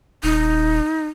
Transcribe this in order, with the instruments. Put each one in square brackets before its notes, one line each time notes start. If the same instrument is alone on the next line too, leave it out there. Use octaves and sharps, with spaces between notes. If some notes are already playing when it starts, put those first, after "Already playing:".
[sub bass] D#1 [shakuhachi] D#4